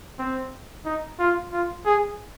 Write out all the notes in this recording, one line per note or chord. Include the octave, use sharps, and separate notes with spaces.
C4
D#4
F4
F4
G#4